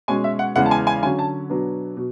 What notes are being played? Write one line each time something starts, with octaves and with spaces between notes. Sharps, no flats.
B2 G#3 C#4 G#5
E5
F#5
E2 C#3 E3 G#3 F#5
A5
G#5
G#5
D3 F#3 C#4 G#5
A5
B2 F#3 B3 D4
B2